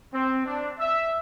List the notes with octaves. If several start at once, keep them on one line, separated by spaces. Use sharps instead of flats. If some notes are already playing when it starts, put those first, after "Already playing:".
C4
D4
E5